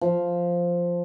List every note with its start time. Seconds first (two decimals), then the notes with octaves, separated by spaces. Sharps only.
0.01 F3